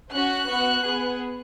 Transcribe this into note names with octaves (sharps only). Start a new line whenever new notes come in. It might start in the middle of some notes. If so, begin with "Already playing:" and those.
C#4 F#4 F#6
B3 F#4
B3 G#4